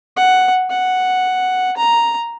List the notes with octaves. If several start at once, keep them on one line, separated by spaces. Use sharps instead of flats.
F#5
F#5
A#5